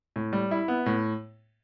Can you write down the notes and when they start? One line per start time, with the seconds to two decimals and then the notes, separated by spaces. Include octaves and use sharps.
0.16 A2
0.33 G3
0.51 E4
0.68 B3
0.86 A2